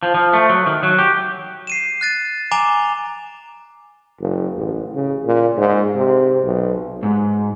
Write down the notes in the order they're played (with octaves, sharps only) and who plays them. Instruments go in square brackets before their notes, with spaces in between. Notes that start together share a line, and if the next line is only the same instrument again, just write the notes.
[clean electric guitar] F3
F3
A3
F#3
D#3
F#3
G4
[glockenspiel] C7 D#7 E7
F#6 A6 D#7
G#5 A#5 D6 E7 F7 G7
[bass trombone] F#1
A1
C#3
A#2
G#2
C3
B1
[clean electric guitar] G#2